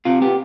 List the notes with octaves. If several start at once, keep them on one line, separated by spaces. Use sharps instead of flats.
C3 F4
B3 G4